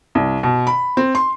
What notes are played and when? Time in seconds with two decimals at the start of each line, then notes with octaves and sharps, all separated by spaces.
0.15 C2
0.43 B2
0.67 B5
0.97 C4
1.15 C6